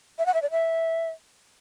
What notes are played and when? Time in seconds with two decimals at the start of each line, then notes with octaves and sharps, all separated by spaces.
0.19 E5
0.26 F#5
0.34 E5
0.42 D5
0.51 E5